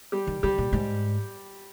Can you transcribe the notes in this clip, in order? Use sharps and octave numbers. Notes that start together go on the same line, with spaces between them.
G3 G4
D#3
D3 G3 G4
A#2
G#2